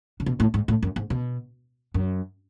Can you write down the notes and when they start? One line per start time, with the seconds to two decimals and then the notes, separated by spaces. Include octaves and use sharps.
0.20 C#3
0.26 B2
0.40 A2
0.54 G#2
0.68 A2
0.83 F#2
0.96 G#2
1.10 B2
1.94 F#2